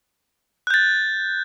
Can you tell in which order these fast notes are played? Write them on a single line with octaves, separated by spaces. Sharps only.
F#6 G6 A6